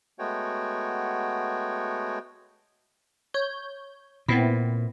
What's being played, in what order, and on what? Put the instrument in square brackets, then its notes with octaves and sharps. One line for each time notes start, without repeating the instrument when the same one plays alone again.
[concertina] G#3 A3 B3 F#4 C#5 G5
[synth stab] C#5 G6
[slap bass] A#2 [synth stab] B3 C4 E4